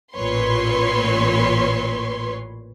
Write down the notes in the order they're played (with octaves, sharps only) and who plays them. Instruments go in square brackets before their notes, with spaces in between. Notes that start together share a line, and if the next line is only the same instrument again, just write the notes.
[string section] A1 A#2 B4 C#5 C6